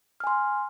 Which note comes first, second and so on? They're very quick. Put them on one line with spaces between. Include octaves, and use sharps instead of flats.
F6 G#5 C6